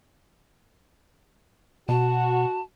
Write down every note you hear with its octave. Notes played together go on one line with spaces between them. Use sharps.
B2 F#4 A5